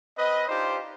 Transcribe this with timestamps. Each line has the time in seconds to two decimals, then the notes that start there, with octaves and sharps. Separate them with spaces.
0.18 C4 B4 D#5
0.48 D4 D#4 F4 G4 C5